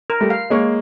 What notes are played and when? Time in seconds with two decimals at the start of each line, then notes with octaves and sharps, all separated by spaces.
0.10 A#4
0.20 G3 A3
0.30 F5
0.50 G#3 A#3 C#5